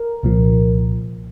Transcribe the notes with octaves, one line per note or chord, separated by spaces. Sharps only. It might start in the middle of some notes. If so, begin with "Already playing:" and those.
Already playing: A#4
C2 A#2 F3